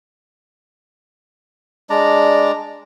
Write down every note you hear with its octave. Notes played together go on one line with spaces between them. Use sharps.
G#3 D4 D5 A#5